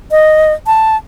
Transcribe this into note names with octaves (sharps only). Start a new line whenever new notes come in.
D#5
A5